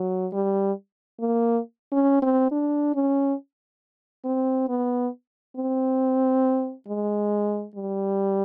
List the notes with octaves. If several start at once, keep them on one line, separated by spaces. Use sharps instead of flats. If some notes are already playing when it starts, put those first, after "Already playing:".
Already playing: F#3
G3
A#3
C#4
C4
D4
C#4
C4
B3
C4
G#3
G3